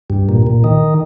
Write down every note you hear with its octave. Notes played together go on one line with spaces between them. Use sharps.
G2
A#2
A#2
D#3